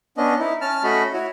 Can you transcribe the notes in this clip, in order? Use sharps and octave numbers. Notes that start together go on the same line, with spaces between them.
B3 C#4 D4 D#5
D#4 E4
C#4 A5 F6
A3 C#4 F#4 D#5 B5
E4 F#4 C#5